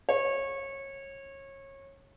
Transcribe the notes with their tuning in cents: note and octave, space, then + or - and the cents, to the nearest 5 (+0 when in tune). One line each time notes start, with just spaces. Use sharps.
C#5 -25